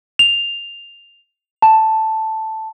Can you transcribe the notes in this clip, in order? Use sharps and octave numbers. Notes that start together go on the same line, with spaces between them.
F7
A5